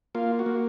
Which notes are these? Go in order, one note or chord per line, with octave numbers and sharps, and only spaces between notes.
A#3 F4
F#4
A#3